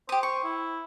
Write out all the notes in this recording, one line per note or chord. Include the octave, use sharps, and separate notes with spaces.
G4 C5 D#6
C#6
E4